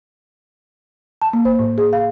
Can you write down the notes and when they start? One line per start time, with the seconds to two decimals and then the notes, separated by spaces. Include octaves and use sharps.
1.22 A5
1.33 A#3
1.45 C5
1.59 A2
1.78 G#4
1.93 F5